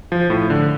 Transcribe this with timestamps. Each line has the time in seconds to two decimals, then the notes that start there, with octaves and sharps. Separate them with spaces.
0.12 F3
0.30 A2
0.50 D3